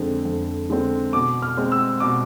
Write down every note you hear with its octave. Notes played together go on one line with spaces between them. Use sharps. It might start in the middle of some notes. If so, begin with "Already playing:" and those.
Already playing: F2 D3 G#3 C4
F2
D3 G#3 C4
B2 D6
F6
G#3 C4
E6
B2 D6